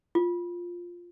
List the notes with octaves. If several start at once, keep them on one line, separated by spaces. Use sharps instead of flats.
F4